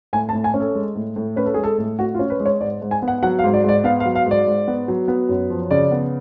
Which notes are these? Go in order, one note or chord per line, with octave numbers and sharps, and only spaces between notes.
A2 G#5
A5
A2
G#5
C#4
A4
G#3
A2
A2
C#4 B4
A4
G#3 G#4
A4
A2
A2 F#4
F4
C#4
B4
G#3
C#5
G#2 D5
G#2
G#5
B3
F#5
F#3 F#5
F5
G#2
D5
G#2 D5
B3 F5
F5
F#3
F5
G#2
D5
G#2
B3
F#3
B3
F#2
F3
C#3 D5
B3